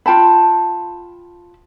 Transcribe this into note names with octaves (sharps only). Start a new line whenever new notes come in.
F4 G5 A5 B5